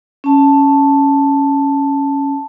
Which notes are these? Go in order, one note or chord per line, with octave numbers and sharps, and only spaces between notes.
C#4 A5